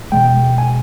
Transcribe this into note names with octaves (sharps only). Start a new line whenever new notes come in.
E2 B2 G#3 G5
G#5